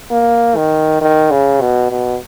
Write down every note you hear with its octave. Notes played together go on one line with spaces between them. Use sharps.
A#3
D#3
D#3
C#3
B2
B2